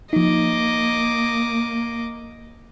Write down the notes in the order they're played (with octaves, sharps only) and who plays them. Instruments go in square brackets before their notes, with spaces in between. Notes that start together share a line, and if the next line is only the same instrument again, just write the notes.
[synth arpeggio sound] F3 D#4 [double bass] A#3 [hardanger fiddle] D#5 D6